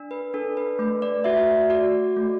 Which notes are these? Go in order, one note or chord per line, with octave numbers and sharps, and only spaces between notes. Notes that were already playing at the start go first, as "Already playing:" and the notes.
Already playing: D4
B4
D4 A4
B4
A3 B4
D5
F#4 E5
F#4 D5
A3